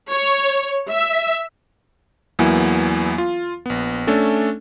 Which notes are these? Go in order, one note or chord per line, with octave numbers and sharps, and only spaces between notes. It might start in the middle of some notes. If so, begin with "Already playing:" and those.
C#5
E5
E2 F#3 A#3 B3 E4 G#5
F4
A#1 B3
A3 C#4 D4 A4